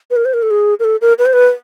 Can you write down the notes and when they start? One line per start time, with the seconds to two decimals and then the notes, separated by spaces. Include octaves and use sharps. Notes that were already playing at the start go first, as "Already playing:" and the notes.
0.11 B4
0.16 A#4
0.25 C5
0.34 A#4
0.43 A4
0.51 G#4
0.80 A#4
0.84 A4
1.01 A#4
1.19 B4
1.26 C5
1.33 B4